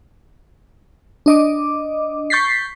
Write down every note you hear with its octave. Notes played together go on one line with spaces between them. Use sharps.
D4 D#5 D6
C#6 G6 A6 B6 C7